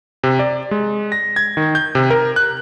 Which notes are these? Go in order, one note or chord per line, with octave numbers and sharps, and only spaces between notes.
C3
D5
G#3
A#6
G#6
D#3
G6
C3
A#4
F#6